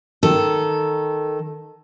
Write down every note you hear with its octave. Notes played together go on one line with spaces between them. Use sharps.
D#3 A4